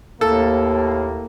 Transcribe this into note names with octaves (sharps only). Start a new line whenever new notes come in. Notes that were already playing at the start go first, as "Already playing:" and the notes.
D#2 A2 A#3 A4